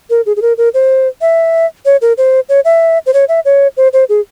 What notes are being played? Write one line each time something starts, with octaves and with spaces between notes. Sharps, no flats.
A#4
G#4
G#4
A#4
A#4
C5
E5
C#5
A#4
C5
C#5
E5
C5
C#5
E5
C#5
C5
C5
G#4